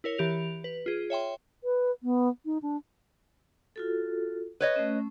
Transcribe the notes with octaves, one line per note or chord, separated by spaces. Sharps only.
E4 A#4 C#5
E3 G4 F7
B4
F4 G#4
C#5 E5 G5 C6
B4
B3
D#4
D4
F4 F#4 A4
B4 C#5 D#5
A3 C#4